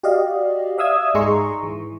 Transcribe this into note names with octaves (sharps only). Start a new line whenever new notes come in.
F#4 G4 D5 D#5 F5
D5 E5 F5 D#6 E6 G#6
G#2 D#4 G#4 A#5 C6 C#6
E3